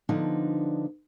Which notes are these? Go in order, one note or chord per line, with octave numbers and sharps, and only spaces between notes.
D3 F3 B3 D4 D#4